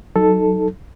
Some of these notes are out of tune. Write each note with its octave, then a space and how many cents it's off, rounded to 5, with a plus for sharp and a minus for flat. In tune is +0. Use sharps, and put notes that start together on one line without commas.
F#3 +5 D#4 +0 A4 +0